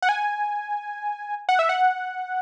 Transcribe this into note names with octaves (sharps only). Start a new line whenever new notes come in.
F#5
G#5
F#5
E5
F#5